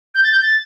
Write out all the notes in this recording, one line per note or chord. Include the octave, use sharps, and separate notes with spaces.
G6
A6
G6
A6